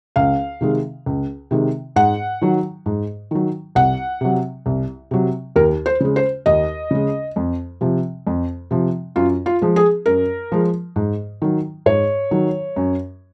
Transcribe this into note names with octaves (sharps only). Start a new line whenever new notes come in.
C#2 F5
C3 D#3 G#3
C#2
C3 D#3 G#3
G#2 F#5
D#3 F#3
G#2
D#3 F#3
C2 F#5
C3 F#3
C2
C3 F#3
D#2 A#4
C5
C#3 G#3
C5
D#2 D#5
C#3 G#3
F2
C3 F3
F2
C3 F3
F#2 F4
F4
F3 G#3
G#4
F#2 A#4
F3 G#3
G#2
D#3 F#3
G#2 C#5
D#3 F#3
F#2